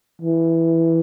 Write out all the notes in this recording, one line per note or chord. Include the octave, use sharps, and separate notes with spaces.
E3